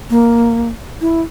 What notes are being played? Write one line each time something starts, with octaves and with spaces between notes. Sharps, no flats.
A#3
E4